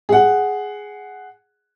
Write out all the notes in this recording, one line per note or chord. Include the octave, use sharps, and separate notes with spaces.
G#4 F#5